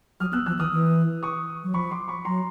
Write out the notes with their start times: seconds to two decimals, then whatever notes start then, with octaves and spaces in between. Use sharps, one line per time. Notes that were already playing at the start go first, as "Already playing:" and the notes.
0.20 F#3 D#6 F6
0.33 B3 E6 F#6
0.46 F3 E6 F#6
0.59 E3 D#6 F6
0.73 E3
1.23 C#6 D#6
1.64 F#3
1.74 F3 B5 C#6
1.91 C6 D6
2.08 B5 C#6
2.25 F#3 A#5 C6